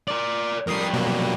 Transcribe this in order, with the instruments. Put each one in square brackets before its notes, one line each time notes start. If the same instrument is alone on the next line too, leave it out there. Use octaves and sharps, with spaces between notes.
[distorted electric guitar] A#4 D5
[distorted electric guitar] F2 G3 [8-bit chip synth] A#4 D#6 C7
[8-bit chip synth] B2 F#3 A#3